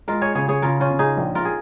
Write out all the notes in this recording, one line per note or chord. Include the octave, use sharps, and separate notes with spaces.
G#3 F4 A#4
G#4 C#5
C#3 G#4 C#5
G#4 C#5
C#3 F4 A#4
C#4 F4
C#3
D#4 G#4
A#1
F4 A#4
G#4